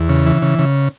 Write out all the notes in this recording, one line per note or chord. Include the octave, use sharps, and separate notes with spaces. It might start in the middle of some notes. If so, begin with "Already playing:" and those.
Already playing: E2
C#3
E3
C#3
C#3